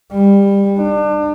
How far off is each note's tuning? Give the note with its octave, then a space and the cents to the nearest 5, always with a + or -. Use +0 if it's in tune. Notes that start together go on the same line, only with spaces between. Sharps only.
G3 +20
D4 +35